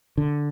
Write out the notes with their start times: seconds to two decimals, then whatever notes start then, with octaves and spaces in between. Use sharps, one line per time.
0.18 D3